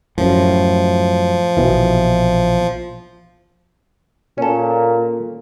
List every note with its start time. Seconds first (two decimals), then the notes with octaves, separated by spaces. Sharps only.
0.18 F#2 A2 F3
1.57 A#1 B2 E3
4.38 A#2 C#4 A4